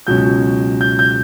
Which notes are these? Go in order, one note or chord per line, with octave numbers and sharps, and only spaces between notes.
C#2 B2 F#3 C#4 G6
G6
G6